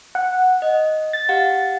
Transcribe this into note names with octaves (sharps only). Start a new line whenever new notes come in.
F#5
D#5
A6
G4 F5 F#5